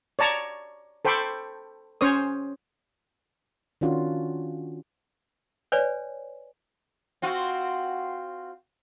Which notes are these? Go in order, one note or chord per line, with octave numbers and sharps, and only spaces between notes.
C#5 D5 A5 A#5 C#6
A4 C5 G5 B5 C#6 D6
C#4 C5 C#5 D#6
D#3 C#4 D4 F4 F#4
B4 C#5 D5 G#5
C4 F4 F#4